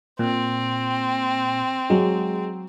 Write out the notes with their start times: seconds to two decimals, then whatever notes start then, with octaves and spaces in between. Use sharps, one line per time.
0.19 A#2 C4
1.90 F#3 G#3